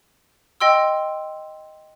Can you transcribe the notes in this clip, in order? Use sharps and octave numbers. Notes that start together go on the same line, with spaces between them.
D#5 G5 C6 E6